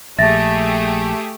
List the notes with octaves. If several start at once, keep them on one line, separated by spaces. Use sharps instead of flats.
A#1 A3 G4 G#4 E5 A6 A#6